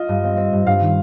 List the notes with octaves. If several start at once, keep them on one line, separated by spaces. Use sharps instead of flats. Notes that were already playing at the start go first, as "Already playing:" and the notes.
Already playing: F4 D#5
G2
C4
C4
G2
G2 F5
D#3